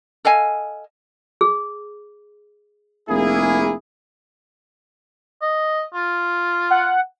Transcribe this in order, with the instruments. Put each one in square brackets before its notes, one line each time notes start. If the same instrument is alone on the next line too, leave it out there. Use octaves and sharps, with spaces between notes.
[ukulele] A4 D#5 F5 G#5
[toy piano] G#4
[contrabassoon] F1 [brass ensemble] A#3 E4 G#4
[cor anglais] D#5
F4
[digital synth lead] F#5